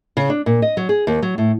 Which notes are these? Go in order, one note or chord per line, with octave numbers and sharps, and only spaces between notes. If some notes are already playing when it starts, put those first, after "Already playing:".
C#3
D4
A#2
D#5
F#3
G#4
D#2
F#3
A2